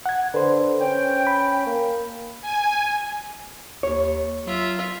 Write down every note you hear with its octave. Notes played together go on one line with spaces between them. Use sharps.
F#5 G#6
D3 B4 C5
C#4 G5
B5
A#3
G#5
D#2 C#5
F#3 F4 E5